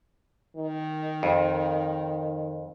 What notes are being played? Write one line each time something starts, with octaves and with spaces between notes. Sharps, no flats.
D#3
F2